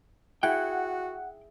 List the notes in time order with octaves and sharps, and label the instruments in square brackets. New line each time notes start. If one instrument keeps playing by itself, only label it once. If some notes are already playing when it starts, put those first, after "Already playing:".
[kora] E4 G#4 [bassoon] F#4 [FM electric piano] F#5 [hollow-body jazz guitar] G5